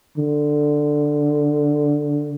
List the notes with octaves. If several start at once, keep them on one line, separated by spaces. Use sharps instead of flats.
D3